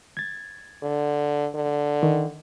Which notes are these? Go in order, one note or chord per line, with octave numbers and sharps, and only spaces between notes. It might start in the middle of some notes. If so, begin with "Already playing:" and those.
G#6 A6
D3
D3
D#3